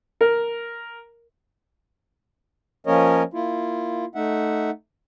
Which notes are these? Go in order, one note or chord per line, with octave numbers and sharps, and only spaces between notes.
A#4
F3 A#3 C#4 A#4 C#5 D#5
A#3 E4 F4
A3 D#4 E5 F#5